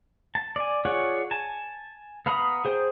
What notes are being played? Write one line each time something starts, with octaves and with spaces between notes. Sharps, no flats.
A5
D5 G#5
F4 G#4 C#5 D5 F#5
G#5 A5
B3 F5 A#5 B5 D#6
G#4 C5 G5